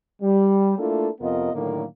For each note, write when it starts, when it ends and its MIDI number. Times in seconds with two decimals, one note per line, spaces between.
0.22 0.74 55
0.78 1.09 57
0.78 1.09 58
0.78 1.09 62
0.78 1.09 64
0.78 1.09 65
0.78 1.09 69
1.21 1.51 41
1.21 1.51 48
1.21 1.51 59
1.21 1.51 65
1.21 1.51 70
1.21 1.51 75
1.54 1.84 45
1.54 1.84 50
1.54 1.84 51
1.54 1.84 54
1.54 1.84 58